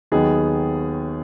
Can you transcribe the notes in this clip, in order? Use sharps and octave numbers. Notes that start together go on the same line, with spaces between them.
D#2 D#3 F#3 B3 D#4 G#4